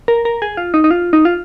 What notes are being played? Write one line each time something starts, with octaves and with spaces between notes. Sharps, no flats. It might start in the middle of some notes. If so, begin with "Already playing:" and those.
A#4
A#4
G#4
F4
D#4
D#4
F4
D#4
F4